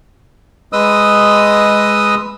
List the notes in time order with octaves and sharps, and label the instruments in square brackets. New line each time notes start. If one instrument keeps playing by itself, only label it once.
[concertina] G#3 B4 D#5 D#6 E6